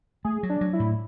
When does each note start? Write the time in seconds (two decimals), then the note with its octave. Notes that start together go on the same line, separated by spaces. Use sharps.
0.24 A3 G#4
0.43 F#3
0.50 D4
0.61 F#3
0.73 E4
0.80 A2